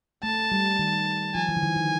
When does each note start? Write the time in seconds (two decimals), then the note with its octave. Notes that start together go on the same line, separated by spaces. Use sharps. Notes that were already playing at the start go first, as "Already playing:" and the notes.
0.23 A3 A5
0.52 G3
0.79 D#3
1.35 F3 G#5
1.49 E3
1.56 D3
1.63 D#3
1.76 D#3